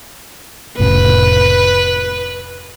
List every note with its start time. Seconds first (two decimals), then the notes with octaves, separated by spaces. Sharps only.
0.79 F1 A2 C#3 B4